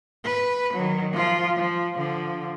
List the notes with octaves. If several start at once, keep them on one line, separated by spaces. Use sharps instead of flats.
B4
D#3 F#3
F3 F4
F3
D3 F3